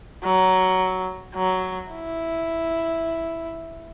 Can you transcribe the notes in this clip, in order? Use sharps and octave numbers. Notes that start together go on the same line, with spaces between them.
F#3
F#3
E4